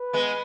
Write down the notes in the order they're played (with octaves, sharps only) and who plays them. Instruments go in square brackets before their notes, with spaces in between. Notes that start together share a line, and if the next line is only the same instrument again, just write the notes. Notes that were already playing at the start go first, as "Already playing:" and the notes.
Already playing: [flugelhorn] B4
[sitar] G#3 B3